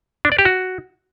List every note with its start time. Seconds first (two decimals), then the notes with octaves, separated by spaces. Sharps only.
0.25 D4
0.32 D5
0.39 G4
0.45 F#4